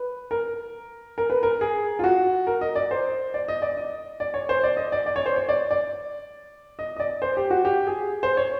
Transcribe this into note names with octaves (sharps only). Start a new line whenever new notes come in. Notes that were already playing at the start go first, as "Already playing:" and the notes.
Already playing: B4
A#4
A#4
B4
A#4
G#4
F4
F#4
A#4
D#5
D5
C5
D5
D#5
D5
D#5
D5
C#5
C5
D5
D#5
D5
D5
C#5
C5
C#5
D5
D5
D#5
D#5
D5
C5
G4
F#4
G4
G#4
C5
C#5